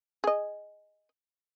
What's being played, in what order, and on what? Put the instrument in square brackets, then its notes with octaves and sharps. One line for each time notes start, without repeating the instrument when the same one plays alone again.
[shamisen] G#4 D#5